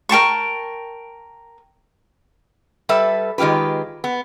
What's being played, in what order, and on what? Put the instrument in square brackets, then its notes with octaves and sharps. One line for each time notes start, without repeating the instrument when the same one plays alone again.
[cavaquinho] A#4 G5 A5 C#6
[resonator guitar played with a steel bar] G3 A4 B4 E5
D#3 G#3 F4 G4 B4
B3